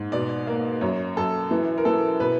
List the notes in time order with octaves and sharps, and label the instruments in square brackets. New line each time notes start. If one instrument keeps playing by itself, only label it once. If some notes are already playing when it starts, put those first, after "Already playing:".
Already playing: [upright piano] G#2
B2 D5
A#3
F#2 C#5
F#2 A4
E3
A#4
E3 A4
B2 B4